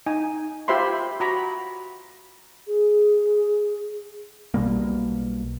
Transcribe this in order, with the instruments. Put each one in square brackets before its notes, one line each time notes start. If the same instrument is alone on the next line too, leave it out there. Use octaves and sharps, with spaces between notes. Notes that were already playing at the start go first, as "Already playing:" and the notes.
[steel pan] D#4 G#5
F4 G4 C5 E5 B5 C6
F#4 A#5 B5
[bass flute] G#4
[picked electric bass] B1 B2 G3 A#3